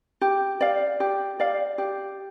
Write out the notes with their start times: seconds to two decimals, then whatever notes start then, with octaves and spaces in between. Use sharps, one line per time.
0.21 G4
0.61 D5 F5
1.00 G4
1.40 D5 F5
1.78 G4